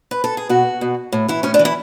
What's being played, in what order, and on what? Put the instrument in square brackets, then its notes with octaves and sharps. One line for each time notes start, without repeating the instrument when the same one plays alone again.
[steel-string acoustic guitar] B4
A4
G#4
B2 F#4
B2
A2
E3 E4
A2 C#4
D4
E3
E4